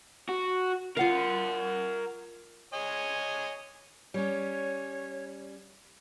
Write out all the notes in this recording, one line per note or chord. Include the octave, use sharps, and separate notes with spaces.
F#4
F4 A#4 F5 F#5
C#5 D#5 G#5
G3 C#4 C#5